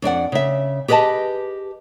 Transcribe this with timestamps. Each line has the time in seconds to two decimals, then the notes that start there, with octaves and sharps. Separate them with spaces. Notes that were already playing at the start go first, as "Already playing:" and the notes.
0.02 F2 D4 D5 F#5
0.32 C#3 E5
0.88 G4 G#4 B4 D5 D#5 A5